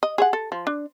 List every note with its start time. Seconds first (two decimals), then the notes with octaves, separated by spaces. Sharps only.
0.03 D#5
0.18 G#4 C#5 F#5
0.33 A4
0.52 F3
0.67 D4